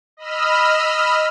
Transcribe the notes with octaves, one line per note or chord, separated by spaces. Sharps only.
D#5 B5 E6 F6